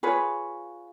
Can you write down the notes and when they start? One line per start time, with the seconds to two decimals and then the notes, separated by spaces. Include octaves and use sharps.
0.03 F4 G#4 B4 C#5